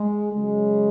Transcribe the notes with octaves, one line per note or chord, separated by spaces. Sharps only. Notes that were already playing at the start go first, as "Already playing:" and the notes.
Already playing: G#3
C#3 F#3 G#3